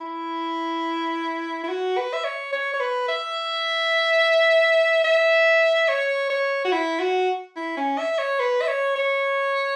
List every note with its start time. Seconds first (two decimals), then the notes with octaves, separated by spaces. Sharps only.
0.01 E4
1.64 E4
1.68 F#4
1.97 B4
2.13 E5
2.24 C#5
2.52 C#5
2.73 C#5
2.80 B4
3.08 E5
5.04 E5
5.88 C#5
6.30 C#5
6.65 F#4
6.72 E4
6.99 F#4
7.56 E4
7.77 C#4
7.98 E5
8.19 C#5
8.39 B4
8.62 E5
8.68 C#5
8.96 C#5